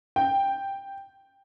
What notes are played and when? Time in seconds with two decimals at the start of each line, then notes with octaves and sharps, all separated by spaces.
0.16 G5